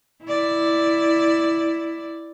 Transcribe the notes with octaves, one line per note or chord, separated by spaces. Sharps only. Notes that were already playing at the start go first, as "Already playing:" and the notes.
E4 D5